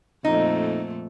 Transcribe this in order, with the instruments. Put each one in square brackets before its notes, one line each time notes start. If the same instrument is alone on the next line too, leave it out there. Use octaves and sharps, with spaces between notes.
[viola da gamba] F2 A#2 A3 [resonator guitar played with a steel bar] D#4